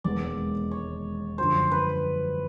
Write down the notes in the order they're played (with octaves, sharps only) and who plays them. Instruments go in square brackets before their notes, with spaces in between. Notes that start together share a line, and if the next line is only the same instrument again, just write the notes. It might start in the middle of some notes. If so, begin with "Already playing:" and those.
[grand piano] E1 D#2 D#3 G#3 B3 [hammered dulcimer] D5
[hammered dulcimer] C#5
[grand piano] F#2 D3 F3 [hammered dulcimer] C5
[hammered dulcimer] B4